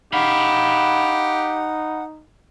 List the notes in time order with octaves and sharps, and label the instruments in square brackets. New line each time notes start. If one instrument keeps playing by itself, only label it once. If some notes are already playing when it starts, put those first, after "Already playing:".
[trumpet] D#4 [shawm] G4 [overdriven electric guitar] F5 B5 [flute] F#5